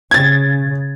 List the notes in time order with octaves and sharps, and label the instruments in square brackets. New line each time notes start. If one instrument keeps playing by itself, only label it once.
[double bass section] C#3 [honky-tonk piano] G#6 A6